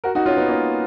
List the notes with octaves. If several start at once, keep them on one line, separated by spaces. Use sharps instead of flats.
F#4 A#4
D#4 F#4
C#4 F4
B3 D#4
A#3 C#4